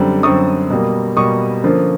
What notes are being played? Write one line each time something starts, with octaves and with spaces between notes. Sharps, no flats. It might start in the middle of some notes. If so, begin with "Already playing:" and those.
Already playing: F#2 D3 G3 C4
F#2 D3 G3 C4 C#6 D#6
B2 G3 A#3
B2 G3 A#3 C#6 D#6
D3 F3 A#3 C#4